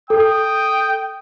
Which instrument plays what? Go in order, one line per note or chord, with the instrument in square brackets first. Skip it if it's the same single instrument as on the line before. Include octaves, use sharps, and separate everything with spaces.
[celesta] A4 [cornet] G5 [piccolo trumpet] D#6